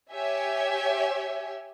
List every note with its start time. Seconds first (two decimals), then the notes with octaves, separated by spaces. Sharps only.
0.11 G4 C#5 E5 G#5